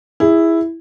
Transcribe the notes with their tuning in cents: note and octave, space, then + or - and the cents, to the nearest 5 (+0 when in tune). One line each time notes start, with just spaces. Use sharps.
E4 +0 G#4 -20